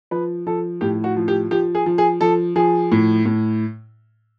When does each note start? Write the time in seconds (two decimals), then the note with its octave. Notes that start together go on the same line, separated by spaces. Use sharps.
0.11 F3 B4
0.47 F3 A4
0.81 A2 G4
1.04 F#4
1.17 F3
1.28 G4
1.51 F3 G4
1.75 G#4
1.86 F3
1.98 G#4
2.21 F3 A4
2.56 F3 G#4
2.92 A2
3.25 A2